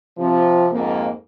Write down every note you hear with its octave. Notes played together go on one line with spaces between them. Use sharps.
C3 F3
F2 G#2 A#3